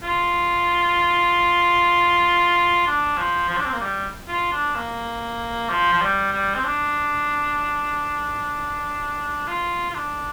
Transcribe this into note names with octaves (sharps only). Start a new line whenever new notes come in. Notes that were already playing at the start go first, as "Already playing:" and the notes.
F4
D4
F3
F3
D4
C4
A#3
G3
F4
D4
A#3
F3
F3
G3
G3
C4
D4
F4
F4
D4